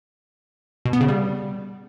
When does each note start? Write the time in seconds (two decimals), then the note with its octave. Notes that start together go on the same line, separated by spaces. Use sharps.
0.85 B2
0.93 B3
1.01 C#3
1.08 G3